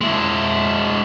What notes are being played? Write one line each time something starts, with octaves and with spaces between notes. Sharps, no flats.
G#3 E4